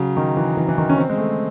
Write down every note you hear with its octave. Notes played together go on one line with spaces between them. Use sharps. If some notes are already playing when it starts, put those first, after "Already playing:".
Already playing: C#3 F#3
D#3
E3
E3
E3
D#3
C#4
C4
G#3
A3